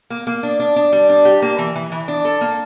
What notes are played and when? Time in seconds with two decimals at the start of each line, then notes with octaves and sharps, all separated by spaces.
0.10 A#3
0.27 A#3
0.43 D4
0.60 D4
0.76 D4
0.92 G3
1.10 D4
1.25 G4
1.42 A#3
1.58 E3
1.76 E3
1.92 E3
2.08 D4
2.25 A4
2.41 A#3